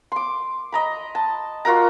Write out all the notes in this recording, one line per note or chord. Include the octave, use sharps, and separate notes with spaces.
C6 D6
D#5 A#5 B5
A5
F4 F#4 A#4 A#5